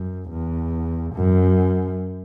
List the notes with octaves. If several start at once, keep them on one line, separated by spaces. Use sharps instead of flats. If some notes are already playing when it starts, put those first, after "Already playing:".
Already playing: F#2
E2
F#2